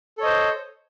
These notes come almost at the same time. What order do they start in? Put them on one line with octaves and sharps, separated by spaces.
A4 C#5 D#5 C5